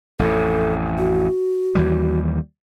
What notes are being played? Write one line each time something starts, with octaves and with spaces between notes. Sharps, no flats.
A1 F2 A2 A4
F#4
D#2 E3 G3